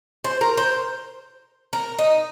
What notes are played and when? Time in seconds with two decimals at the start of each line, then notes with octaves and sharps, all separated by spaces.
0.24 C5
0.41 A#4
0.57 C5
1.73 A#4
1.99 D#4